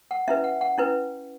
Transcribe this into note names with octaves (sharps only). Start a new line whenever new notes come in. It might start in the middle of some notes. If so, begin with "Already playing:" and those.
F#5
C#4 E4 B4 E5
F#5
F#5
C#4 E4 B4